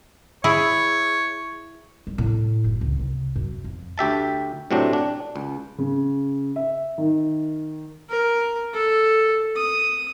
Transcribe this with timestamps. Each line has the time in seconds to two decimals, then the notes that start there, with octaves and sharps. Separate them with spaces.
0.44 E4 G#4 C#5
2.07 G3
2.18 A2
2.64 F#1
2.81 C#2
2.99 C2
3.36 F#2
3.64 F2
3.98 D2 G4 E5 A5
4.71 A2 C3 F#3 C4 D4
4.93 D4
5.36 C#2
5.78 C#3
6.56 E5
6.98 D#3
8.10 A#4
8.74 A4
9.56 D#6